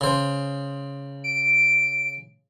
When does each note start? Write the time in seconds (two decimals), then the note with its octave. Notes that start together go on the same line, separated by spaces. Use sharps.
0.01 C#3 C5
1.24 D7